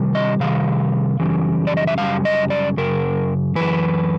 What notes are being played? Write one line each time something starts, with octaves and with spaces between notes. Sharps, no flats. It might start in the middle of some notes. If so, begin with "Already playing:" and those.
Already playing: C3 D#3 G3
D#5
C3 D#3 G3 F5
F#2 C#3 E3 G3
D5
D#5
E5
F#2 C#3 E3 G3 F5
D#5
D5
F#2 C#3 A#4
F#2 C#3 E3 B4